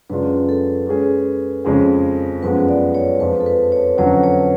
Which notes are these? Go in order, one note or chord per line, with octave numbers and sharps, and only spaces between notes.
F#2 C#3 G#3 D4 F4 B4
A4
G#3 C#4 G#4
F2 C#3 G#3 C#4 G#4
F#2 F3 G#3 B3 B4
D5
C#5
F2 F3 G#3 D4 F4 B4
A4
B4
C#5
F2 D3 F#3 C#4 F#4 C#5
C#5